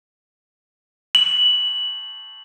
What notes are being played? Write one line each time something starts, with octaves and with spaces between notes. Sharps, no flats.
F#7